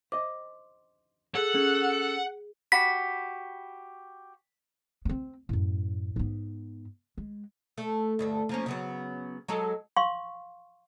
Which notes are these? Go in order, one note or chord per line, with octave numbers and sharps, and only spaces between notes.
C5 D#5 D6
G#4 A4 F#5
C#4 G#4
F#4 G4 B5 B6
B3 C4
F#2 A2
G#2 B3
G#3
A3
D2 G2 A3
F3 A#3 C#4
C#3 F#3 B3
F#3 G#3 A4
F5 C6 C#6